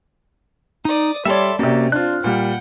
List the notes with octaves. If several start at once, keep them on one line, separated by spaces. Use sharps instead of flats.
D#4 D5 D#6
G3 A4 C#5 D5 E5 C6
C3 A#3 C#4 F#4 G4 D5
C4 D4 F4 F6 F#6
A#2 G3 F#5 G5